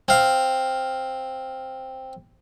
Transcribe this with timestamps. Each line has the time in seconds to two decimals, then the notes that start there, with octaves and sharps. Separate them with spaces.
0.08 C4 F5